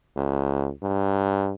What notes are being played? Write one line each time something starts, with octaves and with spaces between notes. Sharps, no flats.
C#2
G2